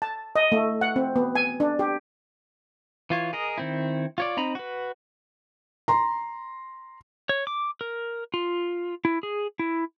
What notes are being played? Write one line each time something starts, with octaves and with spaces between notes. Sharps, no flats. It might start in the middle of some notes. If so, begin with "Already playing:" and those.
A5
D#5
A3
F#5
C4
B3
G#5
D4
G4
E3 F4 C#5
G#4 A#4 D#5
D#3 C4 E4
F4 C#5 D5
C4 D#4 A#5 B5
F#4 B4
A#5 C6
C#5
D6
A#4
F4
E4
G#4
E4